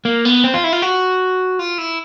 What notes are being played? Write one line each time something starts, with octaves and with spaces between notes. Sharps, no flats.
A#3
B3
C4
F4
E4
F4
F#4
F4
E4